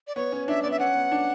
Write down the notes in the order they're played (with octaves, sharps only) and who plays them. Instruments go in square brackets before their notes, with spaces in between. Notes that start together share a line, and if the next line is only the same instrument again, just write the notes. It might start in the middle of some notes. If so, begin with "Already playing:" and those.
[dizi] D5
[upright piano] B3 [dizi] C#5
[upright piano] C#4
[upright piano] D4 [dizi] E5
[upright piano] B3 [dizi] D5
[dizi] E5
[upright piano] C#4 [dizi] F#5
[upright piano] B3
D4